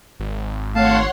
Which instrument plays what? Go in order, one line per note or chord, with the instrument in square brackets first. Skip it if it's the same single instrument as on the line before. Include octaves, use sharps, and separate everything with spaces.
[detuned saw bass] G#1
[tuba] A3 [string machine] C#5 F#5 C6 [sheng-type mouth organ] F5 A5